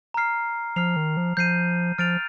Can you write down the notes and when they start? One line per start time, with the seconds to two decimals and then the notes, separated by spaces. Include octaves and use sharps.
0.14 A#5 F6 C7
0.76 F3 F6 C7 F7
0.96 D#3
1.17 F3
1.37 F3 G6 C7 D#7
1.98 F3 F6 A6 D7 F7